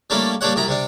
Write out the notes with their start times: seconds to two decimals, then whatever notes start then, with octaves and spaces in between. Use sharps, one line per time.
0.10 G3 A3 A#3 C#4 D4 E4
0.41 G3 A#3 D4 G4 C#5 F#5
0.56 C2 F#2 E4 A#5
0.68 C3 G3 D4